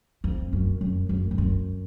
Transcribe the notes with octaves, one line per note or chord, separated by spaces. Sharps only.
F2
F#2
F#2
F#2
F2
F#2